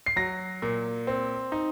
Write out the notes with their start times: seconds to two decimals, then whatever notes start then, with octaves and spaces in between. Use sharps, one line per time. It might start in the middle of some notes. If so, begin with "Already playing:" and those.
0.06 C7
0.16 F#3 A#6
0.62 A#2
1.07 C4
1.52 D#4